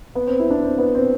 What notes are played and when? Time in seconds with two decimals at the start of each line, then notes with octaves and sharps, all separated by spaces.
0.15 B3
0.27 C4
0.39 E4
0.50 D4
0.63 C4
0.78 B3
0.95 C4